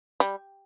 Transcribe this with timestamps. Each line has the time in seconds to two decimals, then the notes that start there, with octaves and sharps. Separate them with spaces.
0.20 G3